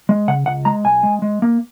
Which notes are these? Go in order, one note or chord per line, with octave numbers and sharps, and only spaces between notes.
G#3
C#3 F#5
C#2 F#5
G#3 A#5
B1 G#5
G#3
G#3
A#3